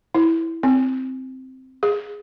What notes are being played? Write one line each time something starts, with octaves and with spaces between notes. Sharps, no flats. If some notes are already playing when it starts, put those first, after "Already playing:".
E4
C4
G#4